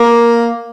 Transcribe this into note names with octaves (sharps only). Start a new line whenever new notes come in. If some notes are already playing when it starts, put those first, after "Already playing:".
Already playing: A#3